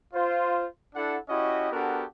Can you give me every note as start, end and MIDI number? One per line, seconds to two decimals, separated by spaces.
0.14 0.66 65
0.14 0.66 72
0.96 1.17 62
0.96 1.17 64
0.96 1.17 69
0.96 1.17 78
1.29 1.70 61
1.29 1.70 64
1.29 1.70 66
1.29 1.70 67
1.29 1.70 75
1.72 2.04 59
1.72 2.04 62
1.72 2.04 66
1.72 2.04 67
1.72 2.04 69
1.72 2.04 70